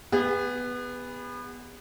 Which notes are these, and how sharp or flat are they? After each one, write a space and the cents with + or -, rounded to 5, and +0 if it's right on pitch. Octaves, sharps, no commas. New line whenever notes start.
B3 +0 G#4 -40